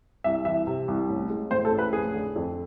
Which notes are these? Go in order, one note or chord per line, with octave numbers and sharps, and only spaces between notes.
C2 E5
E3 E5
C3
C2
A1
G#3
A2 C5
A4
A1
B4
F1 G#4
D3
F2